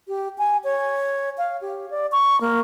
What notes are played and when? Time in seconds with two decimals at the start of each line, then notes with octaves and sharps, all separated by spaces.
0.08 G4
0.38 G#5
0.64 C#5
1.38 F5
1.61 G4
1.91 D5
2.12 C#6
2.41 A#3